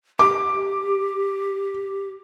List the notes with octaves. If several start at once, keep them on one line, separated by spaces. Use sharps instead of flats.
G4 D6